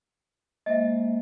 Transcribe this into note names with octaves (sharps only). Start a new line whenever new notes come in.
G#3 A#3 C5 D#5 E5